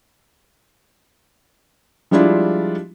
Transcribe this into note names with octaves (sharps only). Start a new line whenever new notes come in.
F3 G3 G#3 D4 E4 F4